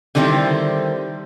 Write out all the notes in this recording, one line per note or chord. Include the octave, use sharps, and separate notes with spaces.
D3 D#3 G3 B3 C4 E4